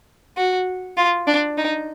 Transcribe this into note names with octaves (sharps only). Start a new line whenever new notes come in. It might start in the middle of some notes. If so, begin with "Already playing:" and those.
F#4
F4
D4
D#4